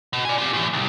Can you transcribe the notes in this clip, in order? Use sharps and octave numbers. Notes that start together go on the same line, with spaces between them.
B2
D5 G#5
F4 G4
A2 E3
C2